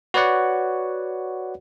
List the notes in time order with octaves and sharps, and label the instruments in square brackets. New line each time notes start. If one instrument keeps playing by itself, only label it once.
[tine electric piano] F#4 B4 C#5 D5 F#5